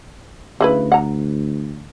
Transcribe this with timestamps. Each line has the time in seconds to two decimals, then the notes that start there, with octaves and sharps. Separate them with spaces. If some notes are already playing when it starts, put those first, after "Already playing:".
0.61 D2 C#3 E4 B4
0.92 F#5 A#5